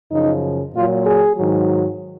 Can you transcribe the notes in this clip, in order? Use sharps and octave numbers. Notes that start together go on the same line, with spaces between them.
F#2 C#3 F3 D#4
A#2 F#3 F4
G#4
G#2 D#3 F#3